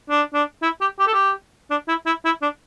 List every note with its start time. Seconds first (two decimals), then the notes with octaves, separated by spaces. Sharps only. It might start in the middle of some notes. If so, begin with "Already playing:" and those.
0.09 D4
0.34 D4
0.62 E4
0.81 G4
0.99 G4
1.07 A4
1.14 G4
1.70 D4
1.88 E4
2.06 E4
2.25 E4
2.42 D4